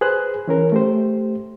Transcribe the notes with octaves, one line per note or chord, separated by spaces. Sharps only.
G#4 B4 C5 F#6
E3 C#4 A#4
A3 G4 C5